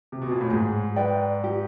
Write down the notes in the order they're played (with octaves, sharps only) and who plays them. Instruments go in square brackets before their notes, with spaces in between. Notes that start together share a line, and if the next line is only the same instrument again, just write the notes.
[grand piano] C3
B2
A#2
A2
[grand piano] G#2 [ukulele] G#4
[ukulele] B4 D5 G5
G4